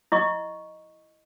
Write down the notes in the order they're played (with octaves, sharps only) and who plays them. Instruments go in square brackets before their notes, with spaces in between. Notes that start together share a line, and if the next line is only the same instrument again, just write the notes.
[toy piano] E4 D#5 C#6